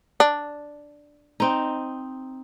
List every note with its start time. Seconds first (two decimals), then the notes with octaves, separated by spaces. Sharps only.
0.20 D4
1.40 C4 D#4